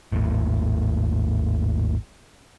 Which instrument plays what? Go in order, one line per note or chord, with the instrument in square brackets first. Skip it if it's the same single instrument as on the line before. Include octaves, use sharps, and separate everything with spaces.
[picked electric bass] G#1 D#2 A2